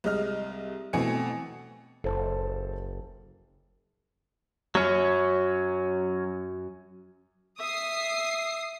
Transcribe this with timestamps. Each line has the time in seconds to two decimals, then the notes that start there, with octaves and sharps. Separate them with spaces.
0.04 C2 G#3 D#5 F6
0.93 B2 E3 A3 C4 G#5 C#7
2.04 F#1 A4 C5 A5
4.75 F#2 F#3 C#4
7.60 E5 D#6 C7